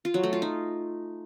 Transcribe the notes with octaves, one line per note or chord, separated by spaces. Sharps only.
F4
F#3
A3
F4
D#4